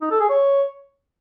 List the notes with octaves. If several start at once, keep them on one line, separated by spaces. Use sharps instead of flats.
D#4
A4
G#4
C#5